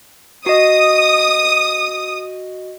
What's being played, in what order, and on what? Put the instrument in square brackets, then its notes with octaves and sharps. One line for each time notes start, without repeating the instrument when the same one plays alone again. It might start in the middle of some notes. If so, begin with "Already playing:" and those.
[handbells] F#4 D#5 [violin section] D#6